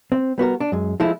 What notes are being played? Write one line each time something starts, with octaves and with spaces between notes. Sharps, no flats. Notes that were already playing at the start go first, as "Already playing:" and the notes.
C4
G3 B3 F#4 A#4
D4
F#2 G#3
F3 G#3 A3 E4